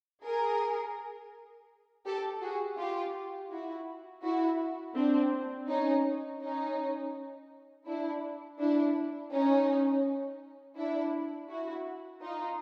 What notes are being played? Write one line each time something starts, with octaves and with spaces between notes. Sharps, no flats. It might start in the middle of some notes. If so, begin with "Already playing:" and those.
G#4 A#4
G4 A4
F#4 G#4
F4 G4
E4 F#4
E4 F#4
C4 D4
C#4 D#4
C#4 D#4
D4 E4
D4 E4
C#4 D#4
D4 E4
E4 F#4
D#4 F4